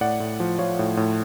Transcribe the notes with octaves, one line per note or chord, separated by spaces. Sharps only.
A2 D5 F#5
A2
F3
F3 C#5 F5
A2
A2